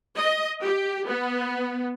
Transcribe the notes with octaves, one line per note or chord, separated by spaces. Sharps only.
D#5
G4
B3